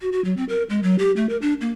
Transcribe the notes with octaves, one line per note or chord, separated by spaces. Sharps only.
F#4
F#4
F#3
C4
A#4
G#3
F#3
G4
A3
A#4
D4
A#3